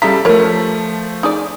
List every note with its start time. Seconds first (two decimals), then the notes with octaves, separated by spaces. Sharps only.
0.02 C#3 G3 E4 A4 A#5 B6
0.25 F3 A3 A#4 C#5
1.23 D#4 G#4 D5